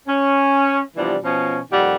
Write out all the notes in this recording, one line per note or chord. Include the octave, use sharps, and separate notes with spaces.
C#4
C3 E3 F3 G3 B3 D4
B2 F3 C#4
F2 A#2 D#3 G3 G4 F#5